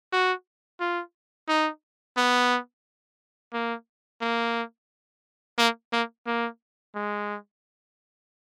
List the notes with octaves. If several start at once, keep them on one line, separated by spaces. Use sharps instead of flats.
F#4
F4
D#4
B3
A#3
A#3
A#3
A#3
A#3
G#3